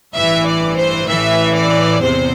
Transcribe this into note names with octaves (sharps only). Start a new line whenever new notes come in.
A1 G2 E3 E5
D5
C5
A1 A2 E3 E5
D5
E2 C3 C5